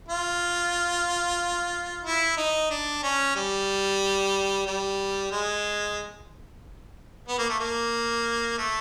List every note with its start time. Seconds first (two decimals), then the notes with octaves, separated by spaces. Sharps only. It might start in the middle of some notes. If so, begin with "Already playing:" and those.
0.08 F4
2.05 E4
2.37 D#4
2.70 D4
3.03 C#4
3.35 G3
4.66 G3
5.32 G#3
7.28 B3
7.39 A#3
7.50 A3
7.60 A#3
8.58 A3